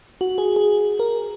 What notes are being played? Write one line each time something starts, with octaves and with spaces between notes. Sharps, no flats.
F#4
G#4
G#4
A#4